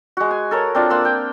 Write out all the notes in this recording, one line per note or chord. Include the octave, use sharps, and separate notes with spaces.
G#3 F#4
G#5
A4 A#4 C#5
C4 D4 F4
A#3 F#5 C6 E6
G5